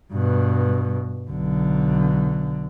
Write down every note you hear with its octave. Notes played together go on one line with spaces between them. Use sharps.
G2 B2
B1 D3